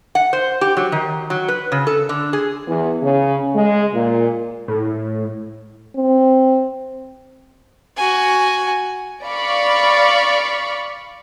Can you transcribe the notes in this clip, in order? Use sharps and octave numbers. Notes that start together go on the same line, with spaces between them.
F#5
C5
G4
F#3
D#3
F#3
B4
C#3
A4
D3
G#4
E2
C#3
G#3
A#2
A2
C4
F#4 G#5
D5 F5 B5 C#6